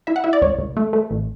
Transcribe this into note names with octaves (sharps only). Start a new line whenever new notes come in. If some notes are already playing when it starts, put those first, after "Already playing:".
E4 E5
F#5
E4 E5
D5
C#2 C#5
C#2
A3
A3
A1